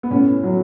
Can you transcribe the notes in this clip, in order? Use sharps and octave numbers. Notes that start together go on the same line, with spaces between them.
B3
A2 C#4
F#3